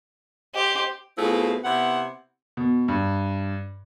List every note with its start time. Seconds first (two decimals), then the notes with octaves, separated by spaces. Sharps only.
0.54 G4 C5 D#5
1.17 B2 A3 C4 E4 F4 G#4
1.64 C3 B3 E4 F#5
2.57 B2
2.88 G2